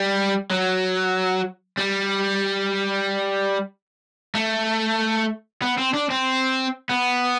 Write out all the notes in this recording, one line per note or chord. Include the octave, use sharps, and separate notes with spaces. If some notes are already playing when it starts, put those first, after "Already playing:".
Already playing: G3
F#3
G3
A3
B3
C4
D4
C4
B3